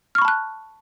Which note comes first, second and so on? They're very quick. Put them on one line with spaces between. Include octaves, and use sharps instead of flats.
F6 C#6 B5 A5 F#6